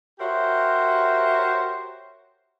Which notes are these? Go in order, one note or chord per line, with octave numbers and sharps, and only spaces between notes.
F#4 G4 A#4 C5 C#5 E5